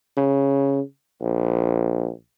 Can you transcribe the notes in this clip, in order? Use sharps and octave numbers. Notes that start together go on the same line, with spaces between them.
C#3
A#1